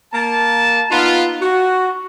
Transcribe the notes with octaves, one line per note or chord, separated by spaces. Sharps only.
A#3 A5
B3 D#4 F4
F#4